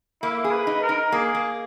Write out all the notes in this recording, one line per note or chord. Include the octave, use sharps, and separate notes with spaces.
A#3 E4
G#4
B4
D#4
A#4
D#4
A#3 G#4
A#3